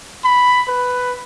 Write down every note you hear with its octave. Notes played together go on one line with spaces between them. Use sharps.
B5
B4